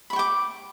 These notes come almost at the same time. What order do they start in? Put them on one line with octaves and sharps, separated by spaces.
B5 C#6 G5 D6